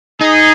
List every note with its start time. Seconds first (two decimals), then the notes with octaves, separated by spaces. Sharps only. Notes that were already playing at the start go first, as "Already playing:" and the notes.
0.21 D#4 G#4